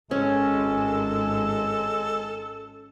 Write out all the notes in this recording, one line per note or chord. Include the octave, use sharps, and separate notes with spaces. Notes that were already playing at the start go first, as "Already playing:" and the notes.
G#1 G#3 C#4 A4